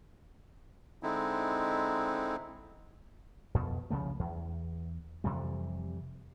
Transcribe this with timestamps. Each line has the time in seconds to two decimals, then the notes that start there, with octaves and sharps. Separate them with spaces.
1.03 D3 G#3 C4 D#4 E4
3.54 F2 B2
3.90 C2 C#3 F3 A3
4.19 E2
5.24 F2 C3 E3 G3